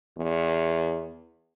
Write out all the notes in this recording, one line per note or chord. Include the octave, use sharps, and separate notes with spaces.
E2